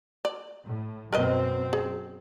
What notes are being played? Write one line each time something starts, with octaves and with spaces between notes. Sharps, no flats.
D5
A2
F#2 B2 C4 A#4 B4 D#5
G#4